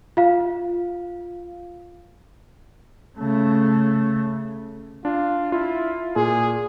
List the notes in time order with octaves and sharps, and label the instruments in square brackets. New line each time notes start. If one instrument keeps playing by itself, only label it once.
[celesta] F4 F5
[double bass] C#3 A3
[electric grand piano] D4 [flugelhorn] F4
[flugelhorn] E4 [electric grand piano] F4
[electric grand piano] A#2 [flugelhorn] G#4